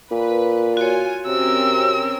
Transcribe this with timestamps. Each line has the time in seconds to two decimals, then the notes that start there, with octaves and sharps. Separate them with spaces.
0.11 A#2 B4
0.77 F4 F#4 C#5 G#5
1.26 C3 C4 C#4 A#4 E6